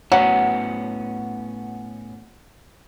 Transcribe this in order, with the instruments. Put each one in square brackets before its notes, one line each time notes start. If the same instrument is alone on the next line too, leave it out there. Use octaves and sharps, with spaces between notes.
[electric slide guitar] A2 B3 C#4 [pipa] F#3 [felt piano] F#5